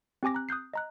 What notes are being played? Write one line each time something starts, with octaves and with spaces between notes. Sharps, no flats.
C4 G4 G#5 D6 A#6
A#5 F#6
D#6 F#6 G6 C7
D#5 A#5 F#6